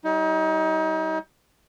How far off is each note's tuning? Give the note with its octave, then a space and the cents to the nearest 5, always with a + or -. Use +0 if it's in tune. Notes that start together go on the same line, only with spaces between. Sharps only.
G3 -25 D#4 +35